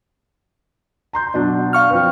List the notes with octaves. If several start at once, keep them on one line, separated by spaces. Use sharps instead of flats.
A#5 C6 G6
B2 F#3 D4
F5 C#6 F6
F3 C4 B4